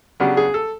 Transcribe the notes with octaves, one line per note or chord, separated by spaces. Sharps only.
C#3 F#3 B3 D4 G4
G#4
A4